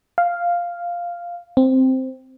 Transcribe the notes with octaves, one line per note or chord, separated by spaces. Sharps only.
F5
C4